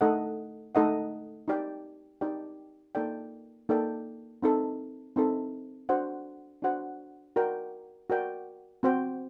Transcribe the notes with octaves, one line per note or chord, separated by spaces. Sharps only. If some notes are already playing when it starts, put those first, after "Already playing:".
A3 D#4 A4 D#5 F#5
A3 D#4 A4 D#5 F#5
D#4 G4 D5 G5
D#4 G4 D5 G5
A#3 D#4 A4 D5 G5
A#3 D#4 A4 D5 G5
C4 D#4 A4
C4 D#4 A4
D4 F#4 C5 F#5
D4 F#4 C5 F#5
F#4 A#4 D5 G5
F#4 A#4 D5 G5
C4 F#4 C5 G5